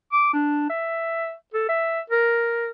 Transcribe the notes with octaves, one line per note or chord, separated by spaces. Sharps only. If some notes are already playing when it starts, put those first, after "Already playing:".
D6
D4
E5
A4
E5
A#4